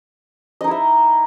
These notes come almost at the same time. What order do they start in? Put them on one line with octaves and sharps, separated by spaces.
D#5 D#4 E4 E5